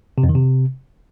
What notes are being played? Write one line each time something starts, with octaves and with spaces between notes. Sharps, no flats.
C3
F2
D#3
C3